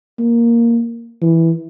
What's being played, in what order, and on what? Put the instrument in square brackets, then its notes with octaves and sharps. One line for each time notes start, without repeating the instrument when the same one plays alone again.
[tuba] A#3
E3